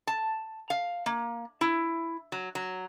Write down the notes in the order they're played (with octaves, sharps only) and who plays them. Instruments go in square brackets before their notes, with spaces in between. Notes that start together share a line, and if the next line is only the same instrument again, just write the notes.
[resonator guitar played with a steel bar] A5
F5
A#3
E4
F#3
F#3